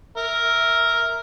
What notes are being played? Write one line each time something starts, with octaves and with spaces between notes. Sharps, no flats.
A#4 E5